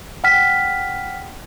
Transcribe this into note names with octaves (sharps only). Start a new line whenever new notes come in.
F#5 G5 F6 B6